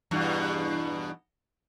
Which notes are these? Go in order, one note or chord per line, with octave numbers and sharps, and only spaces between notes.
E2 G2 B2